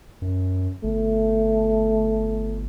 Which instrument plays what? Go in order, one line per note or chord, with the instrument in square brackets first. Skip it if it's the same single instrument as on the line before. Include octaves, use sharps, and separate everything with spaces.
[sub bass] F#2
[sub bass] G1 [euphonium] A3